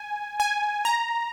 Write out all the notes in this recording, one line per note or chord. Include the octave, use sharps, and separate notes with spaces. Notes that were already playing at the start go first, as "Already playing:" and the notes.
Already playing: G#5
G#5
A#5